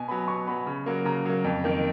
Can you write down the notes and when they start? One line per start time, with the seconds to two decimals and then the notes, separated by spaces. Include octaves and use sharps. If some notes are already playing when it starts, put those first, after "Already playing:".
Already playing: B2 G#5
0.08 F#3 B3 B5
0.28 B2 C#6
0.47 F#3 B3 B5
0.66 C#3
0.86 F#3 A#3
1.05 C#3 A#5
1.25 F#3 A#3
1.44 F2
1.64 D#3 A#3